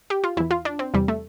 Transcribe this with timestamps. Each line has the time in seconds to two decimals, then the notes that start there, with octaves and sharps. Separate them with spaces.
0.10 G4
0.24 F4
0.37 E2 E3 E4
0.51 F4
0.65 D4
0.79 C4
0.94 E2 C3 E3 G3
1.08 A3